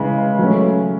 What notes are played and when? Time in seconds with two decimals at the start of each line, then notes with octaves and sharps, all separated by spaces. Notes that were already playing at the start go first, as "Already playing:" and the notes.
Already playing: C#3 E3 G#3
0.39 F#3 A3 C#4